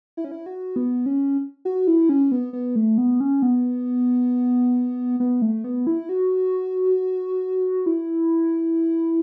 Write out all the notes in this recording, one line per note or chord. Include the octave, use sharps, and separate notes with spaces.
E4
C#4
E4
F#4
B3
C#4
F#4
E4
C#4
B3
B3
A3
B3
C#4
B3
B3
A3
B3
E4
F#4
E4